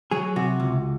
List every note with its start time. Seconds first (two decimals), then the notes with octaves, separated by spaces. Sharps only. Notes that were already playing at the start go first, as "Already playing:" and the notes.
0.11 F#3 G#4
0.36 C3 F#4
0.60 C#2